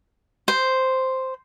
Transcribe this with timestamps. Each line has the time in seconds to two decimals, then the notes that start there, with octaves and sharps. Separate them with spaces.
0.48 C5